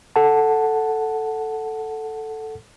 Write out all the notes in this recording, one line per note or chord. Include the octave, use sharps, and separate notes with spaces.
A4 F#5 A5